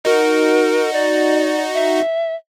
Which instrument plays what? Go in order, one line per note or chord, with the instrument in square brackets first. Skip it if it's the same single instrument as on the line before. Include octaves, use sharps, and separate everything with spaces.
[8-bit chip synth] D#4 F#4 [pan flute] A#4
[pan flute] D5
E5